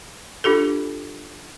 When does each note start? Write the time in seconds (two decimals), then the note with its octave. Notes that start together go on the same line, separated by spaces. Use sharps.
0.44 D4 F4 G4 A4